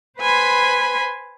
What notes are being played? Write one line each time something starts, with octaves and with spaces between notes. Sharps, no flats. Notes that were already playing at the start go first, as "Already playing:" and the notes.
B4 C5 G#5 B5 C6